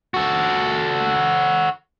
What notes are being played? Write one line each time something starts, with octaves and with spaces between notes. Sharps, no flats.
F#4 A4